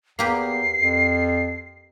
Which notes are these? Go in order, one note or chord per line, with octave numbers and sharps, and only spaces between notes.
E2 A#3 G4 B4 C7
F2